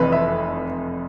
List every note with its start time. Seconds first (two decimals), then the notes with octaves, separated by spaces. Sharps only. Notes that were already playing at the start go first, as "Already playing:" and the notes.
Already playing: F1 F2 E3 B4
0.12 E5